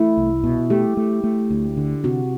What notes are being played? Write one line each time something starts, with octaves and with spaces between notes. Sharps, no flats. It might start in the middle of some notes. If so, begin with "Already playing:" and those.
Already playing: A3 E4
C2
B2
A3 G4
A3
A3
D2
D3
C3 F#4